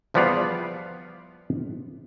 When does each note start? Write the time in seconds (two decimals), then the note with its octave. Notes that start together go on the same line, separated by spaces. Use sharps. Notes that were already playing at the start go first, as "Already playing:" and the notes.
0.14 E2 F3 G3 B3 D5 F5